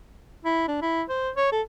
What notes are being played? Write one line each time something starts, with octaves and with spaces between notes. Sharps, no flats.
E4
D4
E4
C5
C#5
A4